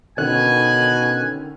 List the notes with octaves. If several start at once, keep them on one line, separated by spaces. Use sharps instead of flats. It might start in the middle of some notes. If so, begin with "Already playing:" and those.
B2 D3 D#3 C#4 G#5 F#6